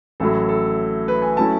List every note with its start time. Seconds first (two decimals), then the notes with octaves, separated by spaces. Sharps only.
0.20 A1 A2 F#3 A4
0.49 A4
1.08 B4
1.22 G#5
1.37 F#3 A3 C#4 E4 A5